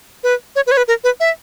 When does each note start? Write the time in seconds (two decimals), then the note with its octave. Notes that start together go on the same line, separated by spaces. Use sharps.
0.24 B4
0.56 C#5
0.67 B4
0.72 C#5
0.77 B4
0.88 A#4
1.04 B4
1.20 E5